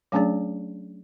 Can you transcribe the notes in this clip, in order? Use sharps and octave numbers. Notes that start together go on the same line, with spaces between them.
F#3 A3 C#4 D4 G#4 D5